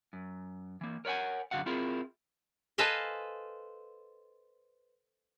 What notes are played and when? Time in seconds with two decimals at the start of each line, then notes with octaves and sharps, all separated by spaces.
0.13 F#2
0.81 E3 A#3
1.05 A#4 C#5 D5 F#5 G#5
1.51 F#2 D3 F#3 F#4 F5 F#5
1.66 C4 E4 F4 G#4 A#4
2.78 A4 B4 C5 D#5 F5 G#5